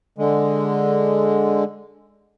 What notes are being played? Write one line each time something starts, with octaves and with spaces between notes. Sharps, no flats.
D3 G#3